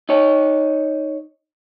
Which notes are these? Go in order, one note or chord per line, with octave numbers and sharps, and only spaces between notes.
D#4 C#5